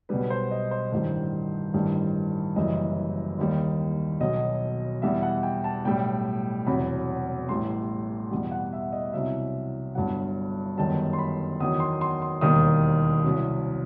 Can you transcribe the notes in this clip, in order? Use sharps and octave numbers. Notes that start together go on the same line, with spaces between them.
B1 B2 G3 B4
C5
D#5
C5
A1 G2 D#3 G3 C5
A1 G2 D#3 G3
F#1 F#2 E3 G3 D#5
D#2 D#3 G3
B1 B2 F#3 D#5
E2 B2 G3 E5
F#5
G5
A5
B1 A2 G3 G5
E1 E2 C3 F#3 B5
A1 A2 G3 C6
E2 B2 G3
F#5
E5
D#5
C2 B2 F#3 E5
G1 G2 F#3 F#5
G1 F#2 D#3 G3 A5
C6
B5
E2 D#3 F#3 D#6
C6
C6
C6
E1 D#2 D#3 G3 D#6
C2 C3 F#3